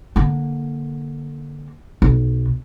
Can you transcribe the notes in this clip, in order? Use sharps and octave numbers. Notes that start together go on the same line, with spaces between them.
D3 A#3
B1